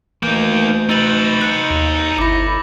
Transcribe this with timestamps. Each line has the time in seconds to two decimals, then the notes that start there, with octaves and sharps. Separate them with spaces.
0.23 D2 E3 A#3 D#4 G6
0.89 D#4 B4 E6 A6 F#7
1.41 F#6 C#7
1.70 D#2
2.18 G1 E4 D6 A#6